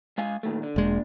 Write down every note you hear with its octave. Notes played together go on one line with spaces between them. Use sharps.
G#3 F5 G#5
A#2 D#3 A3
D3
E1 A#2 G#3 D4